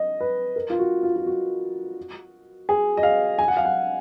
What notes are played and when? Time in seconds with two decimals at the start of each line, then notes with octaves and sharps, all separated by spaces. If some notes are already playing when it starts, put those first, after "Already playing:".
Already playing: D#5
0.21 B4
0.56 A#4
0.70 F4
0.79 F#4
1.03 F4
1.16 F4
1.26 F#4
2.69 G#4
2.97 D#5
3.03 F5
3.39 G#5
3.48 F#5
3.57 F5
3.65 F#5